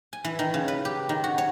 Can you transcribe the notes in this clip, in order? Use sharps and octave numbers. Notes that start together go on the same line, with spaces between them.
G#5
E3
D#3
C#3
B4
G4
D#3
F#4
C#5